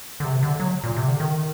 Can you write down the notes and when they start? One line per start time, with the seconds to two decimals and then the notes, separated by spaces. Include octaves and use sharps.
0.20 D3
0.24 C3
0.43 D3
0.60 F#3
0.84 A#2
0.96 C3
1.08 D3
1.20 D#3